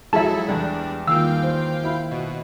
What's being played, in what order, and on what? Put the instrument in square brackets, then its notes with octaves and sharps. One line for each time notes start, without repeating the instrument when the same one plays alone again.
[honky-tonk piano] F3 F#3 [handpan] G#3 G#4 [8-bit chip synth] E4 A4 [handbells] E5 A5
[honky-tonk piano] E2 G3 [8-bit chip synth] D4
[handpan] D#3 A#3 F4 [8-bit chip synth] F5 G5 [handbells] E6
[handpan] C5
[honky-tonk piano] E4 B5
[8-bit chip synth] B2